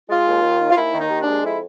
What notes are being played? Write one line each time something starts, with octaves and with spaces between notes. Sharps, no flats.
G#3 F4
D#2
D#3
D#2
F4
D#2 E4
D#3
D#4
D#2
D4
G#3
F2 E4